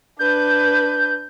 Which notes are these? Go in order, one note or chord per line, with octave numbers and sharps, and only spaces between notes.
D4 B4 G6